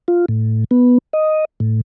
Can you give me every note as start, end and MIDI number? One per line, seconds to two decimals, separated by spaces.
0.08 0.25 65
0.29 0.64 45
0.71 0.98 59
1.13 1.45 75
1.60 1.81 45